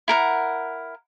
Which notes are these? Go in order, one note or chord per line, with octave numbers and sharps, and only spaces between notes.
E4 A#4 F#5